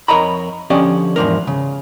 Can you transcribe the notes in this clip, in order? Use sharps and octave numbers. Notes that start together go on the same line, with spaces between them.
F2 A#4 C#5 D#5 A#5 B5
D3 F3 C#4 G4 D5 D#5
E2 G#2 F3 D4 A#4
C#3